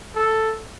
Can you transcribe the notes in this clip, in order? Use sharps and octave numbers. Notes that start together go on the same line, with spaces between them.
A4